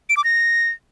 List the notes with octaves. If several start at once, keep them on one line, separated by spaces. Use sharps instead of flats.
D7
D6
A#6